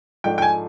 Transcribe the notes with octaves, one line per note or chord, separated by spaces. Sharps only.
G#2 F3 A3 D4 G5
G5
G#5